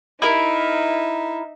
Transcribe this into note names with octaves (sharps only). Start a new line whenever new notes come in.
D#4 E4 A#4 E5